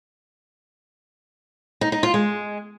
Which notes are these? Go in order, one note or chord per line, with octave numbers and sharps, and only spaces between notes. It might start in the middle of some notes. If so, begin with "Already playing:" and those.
D#4
D#4
F4
G#3